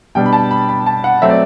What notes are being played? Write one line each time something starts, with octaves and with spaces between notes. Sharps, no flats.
B2 G3 D4 G5
B5
A5
B5
B5
A5
F#5
F#3 A3 C4 E5
D5